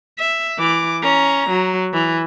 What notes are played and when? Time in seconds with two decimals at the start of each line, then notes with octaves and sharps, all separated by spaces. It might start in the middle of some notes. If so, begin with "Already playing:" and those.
0.19 E5
0.58 E3 D6
1.02 C#4 A#5
1.50 F#3
1.93 E3